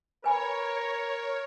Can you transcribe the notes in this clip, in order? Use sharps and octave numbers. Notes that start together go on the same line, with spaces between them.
A#4 B4 C#5 G#5 B5